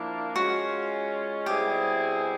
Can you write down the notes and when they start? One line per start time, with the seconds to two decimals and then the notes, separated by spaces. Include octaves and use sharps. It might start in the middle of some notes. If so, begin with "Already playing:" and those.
Already playing: F3 A#3 D4 E4
0.36 G#3 C#4 F4 F#4
1.46 B2 G3 C4 E4 G4 G#4